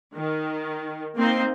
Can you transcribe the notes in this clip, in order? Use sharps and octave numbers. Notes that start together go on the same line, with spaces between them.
D#3
A#3 C4 D#4 C5